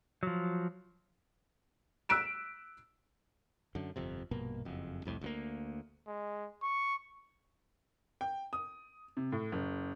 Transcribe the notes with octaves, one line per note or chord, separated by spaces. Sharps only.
F3 F#3
E6 F#6 B6 D7 E7
F#2 D3
G1 F2 C3
A#1 G2 B2 A#3
F#1 F2
C2 F2 A2
D2 F3 A#3
G#3
C#6
G5
D#6
C3
A2
F#1